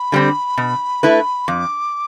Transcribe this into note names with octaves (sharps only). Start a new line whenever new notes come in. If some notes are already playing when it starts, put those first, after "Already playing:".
Already playing: B5
D3 G3 C4
B2
A3 E4 B4
F2 D6